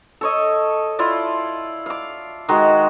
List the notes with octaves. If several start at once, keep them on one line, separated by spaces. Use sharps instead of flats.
A4 C#5 D#5
E4 F4 D5
F5 D6
D#3 G#3 F#4